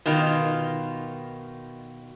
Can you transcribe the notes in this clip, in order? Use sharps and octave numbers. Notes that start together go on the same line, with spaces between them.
B2 D#3 F4